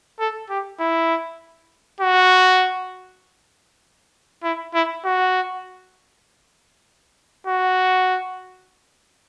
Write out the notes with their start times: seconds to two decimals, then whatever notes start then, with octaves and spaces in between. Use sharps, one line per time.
0.20 A4
0.50 G4
0.80 E4
2.00 F#4
4.43 E4
4.74 E4
5.05 F#4
7.47 F#4